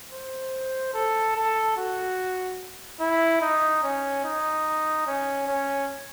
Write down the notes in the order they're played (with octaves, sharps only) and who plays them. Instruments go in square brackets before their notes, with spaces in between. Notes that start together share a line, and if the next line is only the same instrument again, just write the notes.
[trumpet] C5
A4
A4
F#4
E4
D#4
C#4
D#4
C#4
C#4